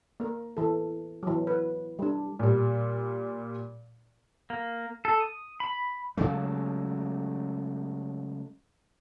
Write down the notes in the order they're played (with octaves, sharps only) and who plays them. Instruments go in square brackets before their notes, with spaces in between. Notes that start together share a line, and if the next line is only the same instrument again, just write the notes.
[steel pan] A#3 A#4
E3 A4
E3 F#3
B4
G3 D4
[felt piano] A#2 G3
[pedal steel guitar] A#3
A4
D#6
B5
[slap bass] C#3 F#3 G#3 A3